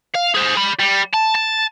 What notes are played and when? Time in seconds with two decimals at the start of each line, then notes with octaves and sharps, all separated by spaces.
0.14 F5
0.35 G#4 C5
0.56 D5 B5
0.80 G3
1.14 A5
1.35 A5